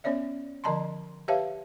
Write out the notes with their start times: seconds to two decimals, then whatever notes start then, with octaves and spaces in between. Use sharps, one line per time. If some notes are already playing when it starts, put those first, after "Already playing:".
0.04 B3 C#4 C#5 D5 E5
0.64 D3 F3 D#5 A5 A#5 C6
1.28 G4 B4 C#5 E5 F5 A5